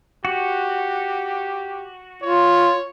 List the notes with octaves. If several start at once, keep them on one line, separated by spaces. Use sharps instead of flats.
F#4 G4
F4 C#5